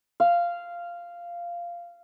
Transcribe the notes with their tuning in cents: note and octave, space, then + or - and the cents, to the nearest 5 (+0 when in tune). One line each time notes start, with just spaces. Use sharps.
F5 -10